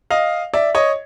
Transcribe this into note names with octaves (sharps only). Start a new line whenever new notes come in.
D#5 F5
D5 E5
C#5 D#5